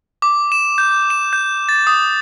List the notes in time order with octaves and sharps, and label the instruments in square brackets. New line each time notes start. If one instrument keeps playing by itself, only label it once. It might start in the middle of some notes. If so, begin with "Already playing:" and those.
[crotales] D6
E7
G6
E7
G6
A6
D#6